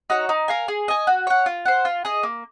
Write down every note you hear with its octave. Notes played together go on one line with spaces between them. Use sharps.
D#4 F#4 C#5
D#4
A#4 F5 G#5
G#4
D#5 G#5
F#4
C#5 F#5
F4
C5 F#5
F4
G#4 D#5
A#3